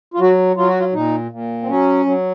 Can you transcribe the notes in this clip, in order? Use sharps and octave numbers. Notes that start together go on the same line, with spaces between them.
F4
F#3 F#4
F#3 F4
F#4
F4
A#2 D#4
A#2
C4
F#3 C#4
F#3